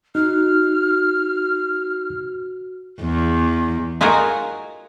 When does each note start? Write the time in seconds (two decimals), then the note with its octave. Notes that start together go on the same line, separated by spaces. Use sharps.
0.15 D#4 F#4 F6
3.02 E2
4.01 D#4 F4 F#4 G#4 A#4